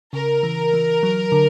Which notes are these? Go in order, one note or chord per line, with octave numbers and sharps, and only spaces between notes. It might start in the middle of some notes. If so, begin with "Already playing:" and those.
C#3 A#4
E3
E3
F#3
D3